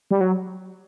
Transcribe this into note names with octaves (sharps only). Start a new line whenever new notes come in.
G3
F#3